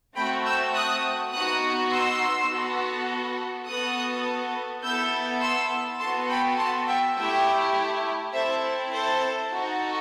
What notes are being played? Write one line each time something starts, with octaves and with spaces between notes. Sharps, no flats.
A3 C4 F#4 G5 B5
E6 G6
D#6 F#6
B3 D#4 F#4 D#6 F#6
C6 E6
B3 F#4 A4
B3 F#4 A4 D#6 F#6
B3 E4 A4 E6 G6
C6 E6
B3 F#4 A4 A5 C6
G5 B5
A5 C6
E5 G5
A3 E4 G4 E5 G5
C4 E4 A4 C5 E5
A4 C5
D#4 F#4 A4